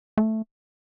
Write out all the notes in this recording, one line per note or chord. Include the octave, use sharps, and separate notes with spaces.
A3